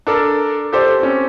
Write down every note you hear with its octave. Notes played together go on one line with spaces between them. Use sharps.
D4 A4 A#4
G4 A4 C5 D5
C4 C#4